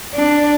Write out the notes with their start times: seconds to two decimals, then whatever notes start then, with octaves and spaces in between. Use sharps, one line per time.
0.15 D4